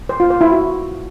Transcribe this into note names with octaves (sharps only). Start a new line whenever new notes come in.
C5
F4
C5
E4
F#4